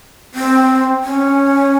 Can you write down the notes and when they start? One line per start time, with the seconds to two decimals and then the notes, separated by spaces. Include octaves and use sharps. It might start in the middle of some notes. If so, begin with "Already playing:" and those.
0.35 C4
1.03 C#4